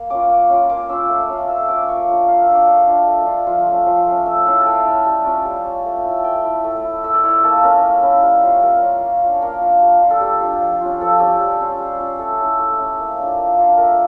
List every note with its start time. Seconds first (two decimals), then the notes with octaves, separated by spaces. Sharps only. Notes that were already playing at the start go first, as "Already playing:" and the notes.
Already playing: A#3
0.10 C#4 F4 D6
0.30 A#3
0.49 C#4 F4
0.69 A#3 D6
0.89 C#4 F4 E6
1.09 A3
1.29 C#4 F4
1.49 A3 E6
1.68 C#4 F4 D6
1.88 A#3 C#6
2.08 D4 F4
2.28 A#3 F5
2.42 E5
2.48 D4 F4
2.55 D5
2.67 A3 C#5
2.87 D4 F4
3.07 A3
3.26 D4 F4
3.46 F3 F4
3.67 A3 C#4
3.86 F3
4.06 A3 C#4
4.26 A3 E5
4.46 C#4 E4 F5
4.61 A5
4.66 A3 G5
4.85 C#4 E4
5.06 G3 A5
5.25 C#4 F4
5.45 G3 G5
5.65 C#4 F4
5.85 A3
6.04 E4
6.19 A5
6.24 A3 G5
6.44 E4
6.64 A3
6.84 E4
7.04 A3 E5
7.14 D5
7.23 E4 C#5
7.44 A#3 A5
7.56 A4
7.63 C#4 E4 A#4
7.83 A#3
8.03 C#4 E4
8.23 G3
8.43 C#4 F4
8.62 G3 A#4
8.82 C#4 F4
9.02 A#3
9.22 D4 F4
9.35 C#5
9.42 A#3 A#4
9.61 D4 F4
9.82 G3
10.01 D4 F4
10.10 A4
10.21 G3 G4
10.40 D4 F4
10.61 F3
10.81 C#4 F4
11.01 F3 A4
11.20 C#4 F4 G4
11.40 G3
11.60 C#4 F4
11.80 G3
11.99 C#4 F4
12.19 A3 A4
12.40 C#4 E4
12.59 A3
12.80 C#4 E4
12.99 A#3
13.19 D4 F4
13.38 A#3
13.58 D4 F4
13.78 A3 A#4